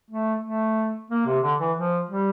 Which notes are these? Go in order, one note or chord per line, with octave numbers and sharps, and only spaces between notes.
A3
A3
A#3
C3
D3
E3
F3
G3